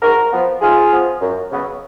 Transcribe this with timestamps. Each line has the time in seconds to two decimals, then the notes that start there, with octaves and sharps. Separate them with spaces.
0.02 G#2 F#4 A#4
0.32 F3 B3
0.61 G#2 F4 G#4
0.91 F3 B3
1.21 F#2
1.51 C#3 F#3 B3